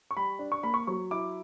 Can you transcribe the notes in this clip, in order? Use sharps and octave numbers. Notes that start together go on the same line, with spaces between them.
C#6
G3 B5
D4
C#6
A#3 B5
C#6
F#3 C#6
E4 D6